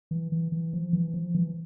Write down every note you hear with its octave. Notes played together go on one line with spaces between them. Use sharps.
E3
E3
E3
F3
E3
F3
E3